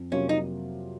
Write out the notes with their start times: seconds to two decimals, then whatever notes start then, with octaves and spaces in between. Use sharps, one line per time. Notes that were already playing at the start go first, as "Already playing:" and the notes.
Already playing: F2
0.12 C3 F#3 A#3 C#4 F4
0.29 D#4